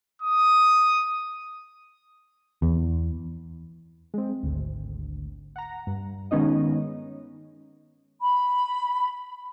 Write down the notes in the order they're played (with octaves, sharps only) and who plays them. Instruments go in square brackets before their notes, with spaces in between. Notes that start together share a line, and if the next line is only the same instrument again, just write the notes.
[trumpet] D#6
[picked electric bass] E2
[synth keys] G#3 C4
G#1 D2
F#5 A#5
G2
D#3 G#3 B3 C#4 D#4 D#5
[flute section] B5